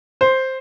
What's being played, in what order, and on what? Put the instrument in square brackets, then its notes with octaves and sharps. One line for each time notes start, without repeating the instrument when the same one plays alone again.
[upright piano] C5